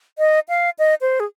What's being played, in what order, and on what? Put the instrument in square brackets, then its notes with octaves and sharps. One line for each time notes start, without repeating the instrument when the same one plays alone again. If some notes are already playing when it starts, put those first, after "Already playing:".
[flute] D#5
F5
D#5
C5
G#4